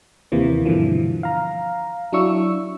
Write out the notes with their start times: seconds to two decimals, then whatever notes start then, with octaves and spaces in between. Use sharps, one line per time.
0.32 D#2 C3 E3 A#3
0.65 G2 B2 D3 E3 F3
1.23 F5 A#5
2.12 F#3 D4 E4 C#6 E6